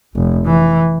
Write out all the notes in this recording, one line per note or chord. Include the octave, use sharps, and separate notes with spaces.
F1
E3